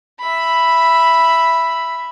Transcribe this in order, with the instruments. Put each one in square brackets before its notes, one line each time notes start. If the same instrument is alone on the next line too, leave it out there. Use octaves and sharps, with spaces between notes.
[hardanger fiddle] E5 B5